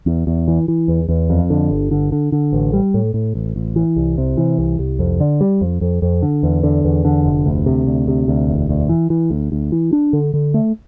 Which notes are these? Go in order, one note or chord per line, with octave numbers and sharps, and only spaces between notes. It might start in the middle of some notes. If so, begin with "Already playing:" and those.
E2
E2
E3
E3
E2
E2
F2
D3
G1
D3
D3
D3
A1
G3
A2
A2
A1
A1
E3
C2
C3
E3
C2
C2
F2
D3
G3
F2
F2
F2
D3
E2
D3
E2
D3
F1
D2
C3
D2
C3
D2
E1
D2
E3
E3
D2
D2
E3
D4
D3
D3
A3